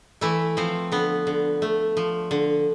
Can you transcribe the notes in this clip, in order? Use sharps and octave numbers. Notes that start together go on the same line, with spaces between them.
E3 A3 E4
F3 C4
D3 B3
D3
A3
F3
D3